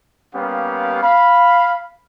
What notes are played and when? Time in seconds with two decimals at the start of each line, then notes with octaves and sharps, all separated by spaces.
0.34 G3 A#3 B3 C#4 G4 F5
1.02 F5 B5